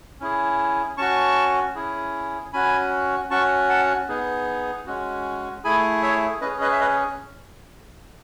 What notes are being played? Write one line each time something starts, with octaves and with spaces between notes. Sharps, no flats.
C#4 E4 G#4
C#4 F#4 A5 C#6
C#4 E4 G#4
C#4 F#4 G#5 B5
C#4 F#4 A5 C#6
F#5 A5
B3 D#4 G#4
G#3 C#4 F#4
A3 E4 G#4 G#5 B5
C#5 E5
C#4 G#4 B4 D#5
B4 D#5
E5
B4 D#5